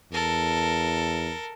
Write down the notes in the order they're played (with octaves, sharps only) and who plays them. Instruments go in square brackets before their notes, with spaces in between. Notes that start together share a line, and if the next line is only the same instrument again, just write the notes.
[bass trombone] E2 [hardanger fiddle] A4 A#4